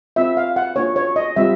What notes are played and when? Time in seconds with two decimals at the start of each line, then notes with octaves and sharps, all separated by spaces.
0.16 C4 F4 E5
0.37 F5
0.56 F#5
0.76 A#3 D4 F4 C#5
0.96 C#5
1.16 D#5
1.36 G3 C4 F4 E5